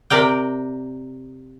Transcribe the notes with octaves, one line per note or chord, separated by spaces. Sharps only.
C3 A#4 D5 G5